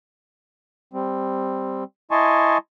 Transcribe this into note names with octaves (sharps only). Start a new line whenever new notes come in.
G3 C4
E4 D#5 G#5 A5 C6 C#6